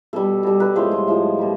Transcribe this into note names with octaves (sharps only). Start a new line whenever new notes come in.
B2 G3 A4
B2 G3
B4
A2 F3 G#3 C5
C5
A2 F3 G#3
B2 G3